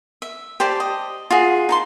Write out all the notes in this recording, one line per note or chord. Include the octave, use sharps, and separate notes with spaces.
E5
G4 C5 D5 A5
D#5
F4 F#4 G#4
D#4 A5 C6